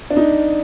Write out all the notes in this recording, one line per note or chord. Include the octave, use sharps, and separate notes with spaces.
D4
D#4